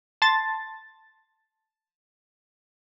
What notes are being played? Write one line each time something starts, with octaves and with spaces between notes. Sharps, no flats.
A5 C6 A6